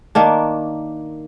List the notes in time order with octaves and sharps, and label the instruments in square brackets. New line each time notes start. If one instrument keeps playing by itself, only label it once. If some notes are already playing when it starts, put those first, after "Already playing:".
[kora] D#3 A#3 D4